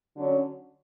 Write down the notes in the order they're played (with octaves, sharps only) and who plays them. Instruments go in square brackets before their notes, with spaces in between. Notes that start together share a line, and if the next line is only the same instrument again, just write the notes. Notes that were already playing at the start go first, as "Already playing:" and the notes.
[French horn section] D3 F#3 C#4